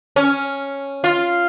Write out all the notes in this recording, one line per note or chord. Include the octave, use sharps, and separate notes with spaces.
C#4
F4